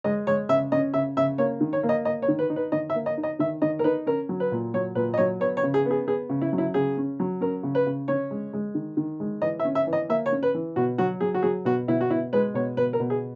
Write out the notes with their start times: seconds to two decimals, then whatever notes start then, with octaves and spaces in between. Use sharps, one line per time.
0.04 G#3 D#5
0.27 G#3 C#5
0.49 C#3 E5
0.72 C#4 D#5
0.94 C#3 E5
1.17 C#3 E5
1.38 A#3 C#5
1.61 D#3
1.73 C#5
1.83 A#3
1.89 D#5
2.05 A#3 D#5
2.22 C#5
2.28 D#3
2.39 B4
2.50 D#4
2.56 B4
2.72 D#3 D#5
2.90 E5
2.95 A#3
3.06 D#5
3.17 D#4
3.23 D#5
3.39 D#3 E5
3.62 D#3 D#5
3.79 A#4
3.84 D#4 B4
4.06 C#4 A#4
4.29 F#3
4.40 B4
4.52 A#2
4.74 F#3 C#5
4.95 A#2 B4
5.14 D#5
5.18 F#3 C#5
5.40 B3 C#5
5.57 C#5
5.63 C#3
5.74 G#4
5.85 B3
5.91 G#4
6.07 B3 G#4
6.29 C#3
6.42 E4
6.53 F#3
6.58 E4
6.74 C#3 G#4
6.97 C#4
7.20 F#3
7.41 C#4 A#4
7.63 C#3
7.75 B4
7.86 C#3
8.08 C#4 C#5
8.31 G#3
8.53 G#3
8.75 D#3
8.97 D#3
9.20 G#3
9.42 E3 D#5
9.60 E5
9.65 C#4
9.75 E5
9.87 E3
9.93 D#5
10.09 A#3 E5
10.26 C#5
10.32 C#4
10.43 B4
10.54 E3
10.76 B2 F#4
10.98 F#3 F#4
11.21 F#3 G#4
11.34 F#4
11.43 F#3 G#4
11.65 B2 F#4
11.88 B2 E4
12.01 F#4
12.10 B2 E4
12.33 G#3 B4
12.54 B2 C#5
12.77 B2 B4
12.93 A#4
13.00 B2
13.10 G#4